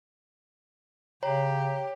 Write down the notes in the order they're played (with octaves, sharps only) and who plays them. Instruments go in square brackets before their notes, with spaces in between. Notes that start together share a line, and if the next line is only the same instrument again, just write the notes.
[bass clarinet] C#3 [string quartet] G4 [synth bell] C#5 [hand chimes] A#5